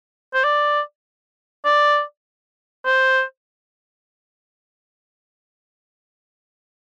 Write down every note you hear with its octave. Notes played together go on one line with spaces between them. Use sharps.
C5
D5
D5
C5